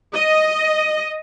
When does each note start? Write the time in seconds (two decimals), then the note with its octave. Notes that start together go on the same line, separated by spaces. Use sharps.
0.14 D#5